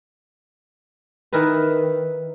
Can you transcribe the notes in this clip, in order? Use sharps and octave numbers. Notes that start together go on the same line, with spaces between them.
D#3 E4 A#4 B4